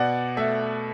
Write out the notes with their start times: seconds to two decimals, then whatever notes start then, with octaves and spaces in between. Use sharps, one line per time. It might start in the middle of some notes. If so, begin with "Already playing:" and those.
Already playing: B2 D5 F#5
0.37 A3 E5